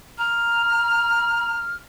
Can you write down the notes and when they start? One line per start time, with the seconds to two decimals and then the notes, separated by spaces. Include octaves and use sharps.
0.18 A#5 F6